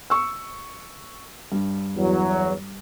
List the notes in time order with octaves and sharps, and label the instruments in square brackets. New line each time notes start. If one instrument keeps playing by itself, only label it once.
[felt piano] C#6 E6
G2
[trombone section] E2 F#3